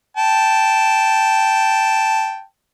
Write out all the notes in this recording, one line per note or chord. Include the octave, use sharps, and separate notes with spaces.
G5 A5